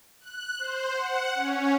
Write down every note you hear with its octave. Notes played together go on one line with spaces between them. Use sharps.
F#6
C5
F#5
C#4